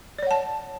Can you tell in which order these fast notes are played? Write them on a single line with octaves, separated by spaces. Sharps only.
D5 C#5 F#5 A5